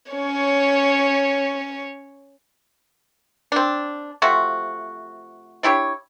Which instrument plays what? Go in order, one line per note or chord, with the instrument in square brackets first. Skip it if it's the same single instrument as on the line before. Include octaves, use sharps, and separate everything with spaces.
[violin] C#4 C#5
[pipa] C4 D4
C3 F3 A3 F#4
D4 E4 G4 C#5